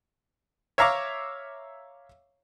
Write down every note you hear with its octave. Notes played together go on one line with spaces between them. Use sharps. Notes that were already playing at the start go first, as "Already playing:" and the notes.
C#5 E5 F5 A#5 C#6 D6